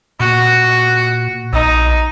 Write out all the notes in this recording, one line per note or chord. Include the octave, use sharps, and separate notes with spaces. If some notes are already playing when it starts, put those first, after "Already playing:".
A#2 F#4
A#1 D#4